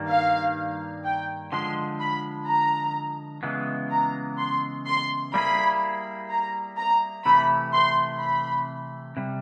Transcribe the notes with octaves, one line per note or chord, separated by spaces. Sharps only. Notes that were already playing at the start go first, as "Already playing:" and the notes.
Already playing: G2 D#3 G3 A#3
F5
G5
D3 F3 G#3 C6
B5
A#5
C#3 E3 G#3 B3
A#5
C6
C6
G3 A#3 C#4 E4 G#4 B5
A#5
A#5
C3 E3 A3 B5
C6
B5
C3 G3